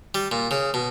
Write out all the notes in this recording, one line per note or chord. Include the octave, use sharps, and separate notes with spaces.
G3
A#2
C#3
B2